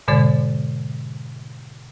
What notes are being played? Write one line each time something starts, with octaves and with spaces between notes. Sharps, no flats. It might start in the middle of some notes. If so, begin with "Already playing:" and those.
G#2 B2 D3 G#3 D5 A6